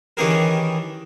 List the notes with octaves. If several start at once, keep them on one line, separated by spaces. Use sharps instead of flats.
D#3 E3 C#4 G4 G#4 A#4